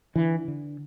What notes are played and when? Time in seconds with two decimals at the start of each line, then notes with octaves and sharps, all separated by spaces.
0.15 D3 E3
0.48 D3